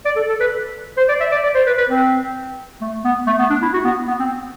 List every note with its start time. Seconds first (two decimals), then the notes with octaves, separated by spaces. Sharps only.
0.05 D5
0.16 A4
0.29 A4
0.40 B4
0.97 C5
1.09 D5
1.21 E5
1.32 D5
1.44 D5
1.54 C5
1.67 B4
1.78 B4
1.90 C4
2.81 A3
3.04 B3
3.27 A3
3.39 B3
3.50 D4
3.62 E4
3.74 F#4
3.85 B3
4.08 B3
4.20 C4